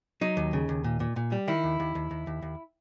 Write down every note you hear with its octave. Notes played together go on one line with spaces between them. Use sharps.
F#3 D#4
D#2
C#3
D#2
A#2
A#2
A#2
G3
D#3 E4
D#2
D#2
D#2
D#2
D#2
D#2